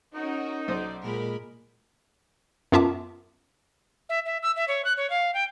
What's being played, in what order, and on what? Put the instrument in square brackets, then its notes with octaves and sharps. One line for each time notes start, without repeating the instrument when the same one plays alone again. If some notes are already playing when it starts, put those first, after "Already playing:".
[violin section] C#4 F#4 A#4 [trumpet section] D#4
[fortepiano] B1 C5 D#6 [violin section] D5
[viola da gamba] A#2 G#3 [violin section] A#4 B5
[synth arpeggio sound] F#2 B3 F4 E5 A5 D6
[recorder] E5
E5
E6
E5
C#5
F#6
C#5
F5
G5